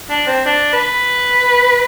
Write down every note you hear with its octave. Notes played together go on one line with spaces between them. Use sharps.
D4
C4
D4
B4